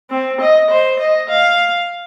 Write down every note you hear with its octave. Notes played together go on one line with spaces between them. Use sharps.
C4
D#5
C5
D#5
F5